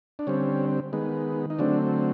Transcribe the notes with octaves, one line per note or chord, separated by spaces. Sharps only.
D4
D3 G3 C4 C#4
D#3 G#3 B3
D#4
D3 F#3 A3 C4 D4